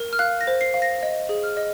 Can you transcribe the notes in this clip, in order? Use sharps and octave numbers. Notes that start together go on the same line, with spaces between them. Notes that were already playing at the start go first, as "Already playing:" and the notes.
Already playing: A#4
F6
F5 F#6
A#6
C5
C7
F5
A#6
D#5
G#4
F6
D#5